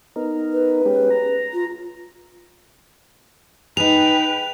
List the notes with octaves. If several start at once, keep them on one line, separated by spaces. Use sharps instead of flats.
B3 D#4 A#4
B4
G#3 C#4 G4
A#5
F4
D#4 G#4 B4 G5 F7